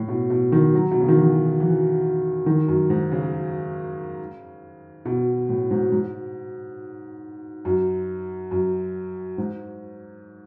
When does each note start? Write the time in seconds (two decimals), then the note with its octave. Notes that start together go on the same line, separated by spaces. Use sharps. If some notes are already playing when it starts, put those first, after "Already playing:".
Already playing: A2
0.08 B2
0.30 B2
0.52 D#3
0.74 F#3
0.91 B2
1.00 C#3
1.08 D#3
1.17 E3
1.60 E3
2.46 D#3
2.68 F#2
2.90 G#2
3.12 C#3
5.05 B2
5.49 A2
5.71 G#2
5.92 G#2
7.65 F#2
8.51 F#2
9.38 G#2